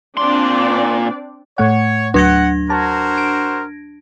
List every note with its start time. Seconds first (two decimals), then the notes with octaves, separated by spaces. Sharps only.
0.17 A#2 C4 D4 D5 C6
1.58 A2 A3 C#5 F#5
2.14 D2 F#3 D4 F#5 G#6 A#6
2.70 F#4 A#4 C5 A5
3.18 D7